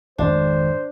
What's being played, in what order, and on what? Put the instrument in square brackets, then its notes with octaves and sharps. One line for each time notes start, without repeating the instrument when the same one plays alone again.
[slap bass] G#1 F2 [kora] D4 [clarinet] C5